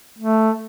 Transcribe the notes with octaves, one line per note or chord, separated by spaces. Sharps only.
A3